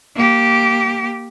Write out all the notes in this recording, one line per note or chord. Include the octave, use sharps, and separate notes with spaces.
A#3 G4